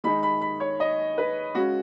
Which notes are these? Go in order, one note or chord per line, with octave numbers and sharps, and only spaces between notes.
D#3 G#3 D#4 B5
B5
B5
C#5
D#5
B4
C#3 G#3 C#4 F#4